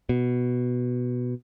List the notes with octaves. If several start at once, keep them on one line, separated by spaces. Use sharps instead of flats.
B2